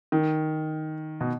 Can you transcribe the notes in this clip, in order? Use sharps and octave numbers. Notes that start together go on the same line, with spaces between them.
D#3
B2